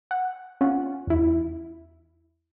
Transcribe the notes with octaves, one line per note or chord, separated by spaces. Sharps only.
F#5
C#4 F4 F#5
E2 E4